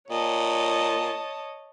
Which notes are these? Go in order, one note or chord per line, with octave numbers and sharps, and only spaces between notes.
A#2 C#5 D#5 A5